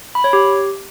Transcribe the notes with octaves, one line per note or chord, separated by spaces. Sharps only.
B5
C#5
G4